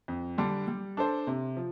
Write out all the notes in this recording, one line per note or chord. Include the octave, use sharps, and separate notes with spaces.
F2
D3 G3 D4
G3
D4 A4 C5
C3
F3